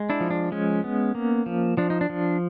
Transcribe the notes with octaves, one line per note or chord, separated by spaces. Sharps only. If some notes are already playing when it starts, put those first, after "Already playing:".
Already playing: G#3
D4 E4
F3
D4
G#3 C#4
B3
A#3
F3
F3 D4
D#4
D4
F3